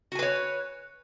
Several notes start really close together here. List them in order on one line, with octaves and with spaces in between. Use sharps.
F#4 G#5 B4 C#5